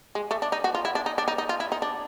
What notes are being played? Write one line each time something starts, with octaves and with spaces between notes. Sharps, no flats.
G#3
A3
D4
D#4
F#4
F4
E4
D4
D#4
D4
D#4
D#4
F4
E4
D#4
D4